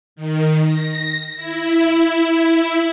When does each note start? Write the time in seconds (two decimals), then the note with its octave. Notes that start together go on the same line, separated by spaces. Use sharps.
0.16 D#3
0.65 A#6
1.36 E4